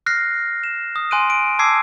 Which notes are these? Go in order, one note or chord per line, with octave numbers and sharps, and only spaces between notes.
F6 F#6 A#6 C7
E7
D#6
G#5 C6 F#6 D7 D#7
D7
A5 D6 E6 G#6 C7